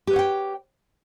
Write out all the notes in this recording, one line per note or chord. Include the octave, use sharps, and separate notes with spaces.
G4 B4 C#5 F#5 G5